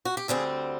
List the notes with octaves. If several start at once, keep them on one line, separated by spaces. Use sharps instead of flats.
F#4
G4
D2 D3 G3 C4 G#4